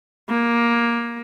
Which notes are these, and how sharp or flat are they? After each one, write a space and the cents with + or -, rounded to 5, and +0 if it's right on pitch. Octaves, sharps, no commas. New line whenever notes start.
A#3 +15